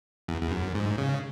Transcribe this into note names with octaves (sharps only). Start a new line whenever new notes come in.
E2
E2
F#2
G#2
C#3